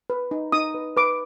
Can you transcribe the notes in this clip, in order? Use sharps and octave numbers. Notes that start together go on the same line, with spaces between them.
B4
D#4
D#4 D#6
B4
B4 D6